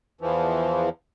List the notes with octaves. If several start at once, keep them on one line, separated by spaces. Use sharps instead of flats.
E2 E3 F3